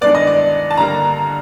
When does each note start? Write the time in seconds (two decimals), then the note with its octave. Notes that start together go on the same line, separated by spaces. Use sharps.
0.01 G2 D#3 G#3 B3 D5
0.15 D#5
0.27 D5
0.71 A5
0.76 G2 D3 G3 A#3 A#5